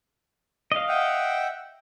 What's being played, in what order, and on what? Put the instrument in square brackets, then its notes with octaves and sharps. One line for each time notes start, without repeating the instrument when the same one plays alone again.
[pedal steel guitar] D#5 F5
[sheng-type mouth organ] E5 F#5 G5